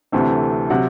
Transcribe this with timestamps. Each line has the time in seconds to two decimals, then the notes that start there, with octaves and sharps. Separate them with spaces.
0.12 D2 C3 E3 A3 C4
0.70 C3 F#3 F#5